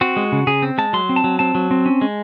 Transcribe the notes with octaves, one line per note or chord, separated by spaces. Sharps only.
C4 F#4
G#3
C#3
C#3 G#4
C4
G#3 A5
F#3 C6
C4
A5
F#3
C4 A5
F#3
C4
C#4
G#3